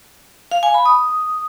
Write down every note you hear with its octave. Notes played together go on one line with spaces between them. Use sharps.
F5
G#5
B5
D#6